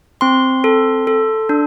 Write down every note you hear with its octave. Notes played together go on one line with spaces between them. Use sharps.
C4 C6
A4
A4
D4